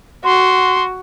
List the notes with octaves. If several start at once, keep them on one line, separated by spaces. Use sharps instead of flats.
F#4 C6